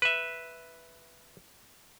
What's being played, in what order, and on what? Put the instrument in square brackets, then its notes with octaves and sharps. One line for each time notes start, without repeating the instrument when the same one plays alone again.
[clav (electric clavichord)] B4 E5